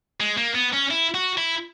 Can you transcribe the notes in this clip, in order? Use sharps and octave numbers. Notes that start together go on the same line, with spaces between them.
G#3
A#3
B3
C#4
E4
F#4
E4